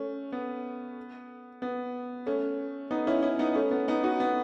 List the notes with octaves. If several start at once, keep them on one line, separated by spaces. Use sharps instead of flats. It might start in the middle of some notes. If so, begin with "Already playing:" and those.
Already playing: A3 C#4
B3
B3
A3 C#4
B3 D#4
C#4 E4
C#4 E4
B3 D#4
A3 C#4
B3
B3 D#4
D#4 F#4
B3